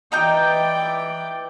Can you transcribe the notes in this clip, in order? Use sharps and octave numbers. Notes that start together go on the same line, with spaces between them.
E3 D#4 D5 G5 A#5 G6